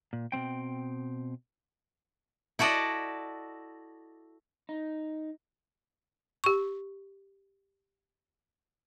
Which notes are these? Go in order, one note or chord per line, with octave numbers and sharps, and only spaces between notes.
A#2
B2 G3 C4 G5
E4 F#4 A4 D5 D#5
D#4
G4 C#6